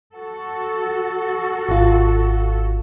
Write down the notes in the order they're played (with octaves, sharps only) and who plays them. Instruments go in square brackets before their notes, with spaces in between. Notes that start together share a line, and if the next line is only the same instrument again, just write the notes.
[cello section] F#4 A4
[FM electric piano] G#1 F4